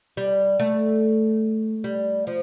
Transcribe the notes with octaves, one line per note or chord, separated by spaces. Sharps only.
G3
A3
G3
F3